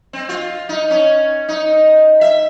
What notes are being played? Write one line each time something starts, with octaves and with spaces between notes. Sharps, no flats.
C4
F4
D#4
C#4
D#4
E5